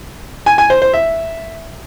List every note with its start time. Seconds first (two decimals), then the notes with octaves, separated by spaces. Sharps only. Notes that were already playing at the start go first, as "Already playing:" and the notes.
0.46 G#5
0.58 G#5
0.70 C5
0.82 C5
0.93 E5